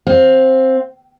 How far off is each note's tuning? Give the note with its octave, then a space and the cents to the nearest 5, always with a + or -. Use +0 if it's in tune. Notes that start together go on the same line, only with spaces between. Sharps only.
C4 +5 F5 +25